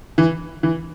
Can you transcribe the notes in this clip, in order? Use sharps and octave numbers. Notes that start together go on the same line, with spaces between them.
E3
E3